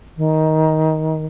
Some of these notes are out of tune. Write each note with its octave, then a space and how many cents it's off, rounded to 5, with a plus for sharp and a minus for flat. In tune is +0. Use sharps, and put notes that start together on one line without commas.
D#3 +15